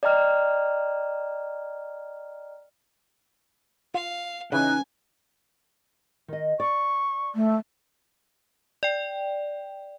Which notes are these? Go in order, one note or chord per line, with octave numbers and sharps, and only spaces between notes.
D5 D#5 G5 A#5 F6
F4 F5
C#3 E3 C#4 D#4 G#5 F#6
D#3 D#5
D5 C#6
A3
D5 G5